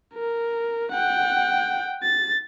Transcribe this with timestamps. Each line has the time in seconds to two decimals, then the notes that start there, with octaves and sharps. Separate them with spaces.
0.14 A#4
0.91 F#5 G5
2.03 A6